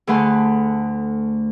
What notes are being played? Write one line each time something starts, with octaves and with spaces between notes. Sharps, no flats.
D2 A3 G#4 B4 F#5 C6